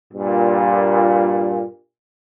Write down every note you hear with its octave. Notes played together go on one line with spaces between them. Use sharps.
G2 A#2